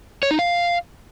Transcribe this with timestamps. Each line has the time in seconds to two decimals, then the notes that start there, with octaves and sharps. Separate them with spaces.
0.23 C#5
0.31 D#4
0.39 F5